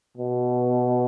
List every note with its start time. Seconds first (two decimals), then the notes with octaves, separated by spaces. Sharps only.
0.17 B2